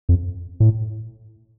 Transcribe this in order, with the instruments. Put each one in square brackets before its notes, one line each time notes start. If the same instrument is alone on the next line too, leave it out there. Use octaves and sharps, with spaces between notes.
[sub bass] F2
A2